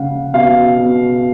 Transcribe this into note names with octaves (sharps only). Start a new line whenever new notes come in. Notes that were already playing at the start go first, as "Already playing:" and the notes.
Already playing: C#3 A#3 F5 F#5
B2 F5
B2